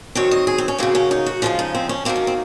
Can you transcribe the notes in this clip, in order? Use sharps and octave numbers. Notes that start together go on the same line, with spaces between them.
D#3 F#3 C4 C#5
D#5
G#4
C4
C#4
C#3 F#3 A#3 C4
C#4
D#4
F#4
C#3 F3 G#3 F4
D#4
C4
C#4
D#3 F#3 A#3 C4
C#4
C4